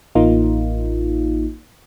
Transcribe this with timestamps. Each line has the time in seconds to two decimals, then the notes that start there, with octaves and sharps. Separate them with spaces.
0.15 A1 A#3 D#4 F4